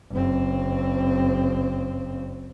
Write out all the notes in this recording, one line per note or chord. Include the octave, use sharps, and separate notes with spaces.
F#1 C4